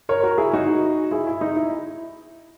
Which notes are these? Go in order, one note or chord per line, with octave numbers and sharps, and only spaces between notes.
A#4 C#5
F#4 A#4
E4 G#4
D#4 F#4
E4 G#4
E4
D#4
E4